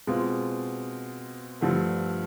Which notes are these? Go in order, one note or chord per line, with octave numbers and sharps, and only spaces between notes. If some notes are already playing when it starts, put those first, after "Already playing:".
B2 G#3 C4 F4
G2 D3 F3 A3